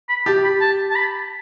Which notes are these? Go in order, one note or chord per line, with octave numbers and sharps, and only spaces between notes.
B5
G4 A5
B5
A5
A5
B5